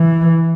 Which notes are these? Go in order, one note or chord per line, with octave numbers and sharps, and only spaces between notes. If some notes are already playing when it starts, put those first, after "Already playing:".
Already playing: E3